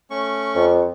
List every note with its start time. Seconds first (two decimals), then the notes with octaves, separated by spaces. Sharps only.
0.10 A3 C#4 C#6
0.56 F2